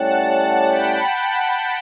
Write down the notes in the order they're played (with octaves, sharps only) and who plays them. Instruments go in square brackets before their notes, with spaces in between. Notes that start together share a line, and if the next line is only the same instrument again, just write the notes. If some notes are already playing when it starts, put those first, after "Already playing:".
Already playing: [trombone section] A2 G3 C#4 G4 [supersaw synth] F#5 A5
[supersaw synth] G5 B5